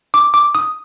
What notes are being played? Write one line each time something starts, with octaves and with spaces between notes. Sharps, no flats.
D6
D6
D#6